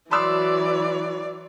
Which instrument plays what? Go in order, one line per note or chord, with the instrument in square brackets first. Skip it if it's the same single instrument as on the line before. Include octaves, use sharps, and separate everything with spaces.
[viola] E3 F#3 [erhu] D5 [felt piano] B5 C6 E6